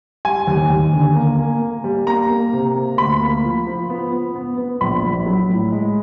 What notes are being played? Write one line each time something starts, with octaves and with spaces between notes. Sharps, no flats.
G3 G#5
D#2
D#2
D3
A#3
A#3
A#3
G3
A#3 A#5
A#3
C3
A#3
D2 B5
A#3
F3
F3
B3
B3
B3
B3
A#1 B5
A#1
F#3
A2
G#3